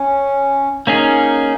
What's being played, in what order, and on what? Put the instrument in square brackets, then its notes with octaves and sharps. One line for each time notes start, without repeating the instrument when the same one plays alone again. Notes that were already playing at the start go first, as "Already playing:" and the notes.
Already playing: [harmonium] C#4
[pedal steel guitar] A#3 C#4 G#4 [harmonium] D#4